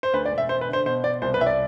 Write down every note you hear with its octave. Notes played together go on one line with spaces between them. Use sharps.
C5
D2 B4
D5
E1
E5
E1 C5
B4
D3 C5
B2 C5
B2 D5
C2 C5
B4
C2 E5
D5